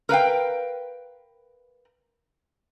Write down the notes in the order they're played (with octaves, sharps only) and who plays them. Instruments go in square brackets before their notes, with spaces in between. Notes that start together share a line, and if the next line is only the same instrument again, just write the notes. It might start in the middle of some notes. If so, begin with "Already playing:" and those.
[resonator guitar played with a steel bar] A#4 B4 F5 G5